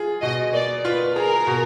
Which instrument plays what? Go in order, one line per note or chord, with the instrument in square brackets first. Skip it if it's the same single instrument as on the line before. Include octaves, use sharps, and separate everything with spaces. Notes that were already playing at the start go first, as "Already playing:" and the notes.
Already playing: [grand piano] F4 G#4
[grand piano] B2 [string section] D#5
[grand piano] A#3 [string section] D5
[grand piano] F4 [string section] B4
[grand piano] G#4 [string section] A#4
[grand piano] B2